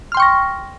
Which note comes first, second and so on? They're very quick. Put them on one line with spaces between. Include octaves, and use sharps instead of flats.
F6 C6 G5 C#6 A#6